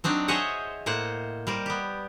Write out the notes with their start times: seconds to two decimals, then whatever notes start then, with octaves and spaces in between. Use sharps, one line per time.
0.04 F#3 C4 D4 D#4
0.28 G#4 C5 C#5 D#5 E5 F#5
0.86 A2 A#3 C5 F#5
1.47 G3 A#4 C5
1.66 B3 G4